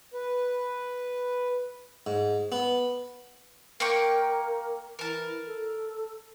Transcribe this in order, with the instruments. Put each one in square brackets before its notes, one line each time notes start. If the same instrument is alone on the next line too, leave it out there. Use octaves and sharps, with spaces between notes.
[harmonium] B4
[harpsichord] G#2
B3
[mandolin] A#3 G5 C#6 [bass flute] A#4
[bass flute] E3 [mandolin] A#4 A5
[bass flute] A4